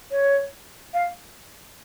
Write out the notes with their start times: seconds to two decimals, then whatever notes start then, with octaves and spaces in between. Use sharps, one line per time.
0.12 C#5
0.94 F5